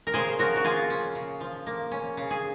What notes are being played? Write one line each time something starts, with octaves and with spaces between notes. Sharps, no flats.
A#4
C#3 G#4 C5
F3 F#4 A#4
F#4
A#3 F4 G#4
C#4
C#3
F3
A#3
C#4
C#3
G#4